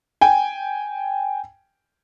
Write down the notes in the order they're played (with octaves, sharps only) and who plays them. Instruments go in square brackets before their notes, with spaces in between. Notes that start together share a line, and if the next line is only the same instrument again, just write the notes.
[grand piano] G5 G#5